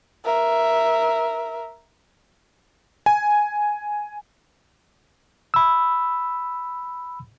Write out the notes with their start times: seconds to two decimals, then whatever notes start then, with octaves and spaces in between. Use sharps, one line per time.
0.25 A#4 E5
3.06 G#5
5.54 B5 E6